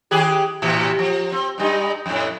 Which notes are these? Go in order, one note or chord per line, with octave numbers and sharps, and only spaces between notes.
D#3 G4 G#4
A2 C3 E3
F3
C4
G2 G3 D#4
F2 A2